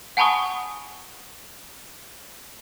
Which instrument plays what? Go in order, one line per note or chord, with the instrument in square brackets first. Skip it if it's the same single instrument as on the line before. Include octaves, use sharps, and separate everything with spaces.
[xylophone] F#5 G#5 A5 B5 C#6 D#6